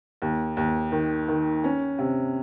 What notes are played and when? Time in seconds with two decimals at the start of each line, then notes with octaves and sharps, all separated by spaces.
0.22 D#2
0.57 D#2
0.92 D#3
1.28 D#3
1.64 C#4
1.99 C3